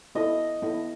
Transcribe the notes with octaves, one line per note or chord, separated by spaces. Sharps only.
B3 E4 A4 D#5
B3 E4 A4